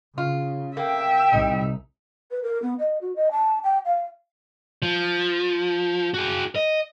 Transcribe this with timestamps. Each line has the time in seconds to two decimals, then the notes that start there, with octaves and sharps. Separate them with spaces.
0.18 C#3 F4
0.77 A#3 E5 G5
1.33 C2 D#4
2.31 B4
2.43 A#4
2.62 B3
2.79 D#5
3.01 F#4
3.16 D#5
3.31 A5
3.63 G5
3.85 F5
4.82 F3
6.14 F#4 G#4
6.55 D#5